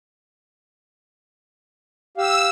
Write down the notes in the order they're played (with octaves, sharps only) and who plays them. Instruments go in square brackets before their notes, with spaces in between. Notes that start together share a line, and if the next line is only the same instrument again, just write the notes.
[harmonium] G4 F5 [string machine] E6